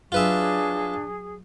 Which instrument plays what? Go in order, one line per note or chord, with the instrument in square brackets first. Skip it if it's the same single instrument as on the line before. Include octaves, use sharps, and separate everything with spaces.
[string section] F#3 [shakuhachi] D4 [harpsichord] F4 B4 E5 [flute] G#4